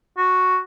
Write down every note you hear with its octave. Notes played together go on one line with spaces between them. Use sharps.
F#4